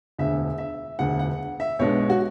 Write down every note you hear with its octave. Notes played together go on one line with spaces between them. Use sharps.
E1 D2 D3 E5
E5
E1 D2 D3 F#5
F#5
E5
B1 B2 G#3 D4 C#5
F#4